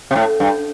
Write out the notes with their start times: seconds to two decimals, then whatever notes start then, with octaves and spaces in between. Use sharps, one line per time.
0.11 C3
0.16 A2
0.40 G2